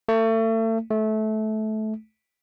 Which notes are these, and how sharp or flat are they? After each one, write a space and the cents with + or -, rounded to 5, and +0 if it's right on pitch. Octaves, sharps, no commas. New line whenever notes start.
A3 +35
A3 -20